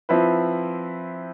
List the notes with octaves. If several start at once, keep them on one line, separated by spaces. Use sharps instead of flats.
F3 C4 E4 B4